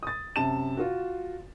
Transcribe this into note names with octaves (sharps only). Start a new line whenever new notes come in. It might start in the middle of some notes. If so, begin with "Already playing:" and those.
D#6 A6
F#2 C3 A5 E7
F4 F#4